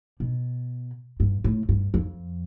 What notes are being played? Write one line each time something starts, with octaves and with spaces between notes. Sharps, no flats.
B2
G2
A2
G2
F2